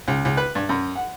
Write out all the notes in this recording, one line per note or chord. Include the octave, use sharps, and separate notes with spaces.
C#2
C#2
B4
G2
F#2
F#5